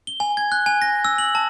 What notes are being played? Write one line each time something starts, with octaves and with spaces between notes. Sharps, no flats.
G7
G#5
G#6
F#6
G#5
A#6
E6
F#7
A5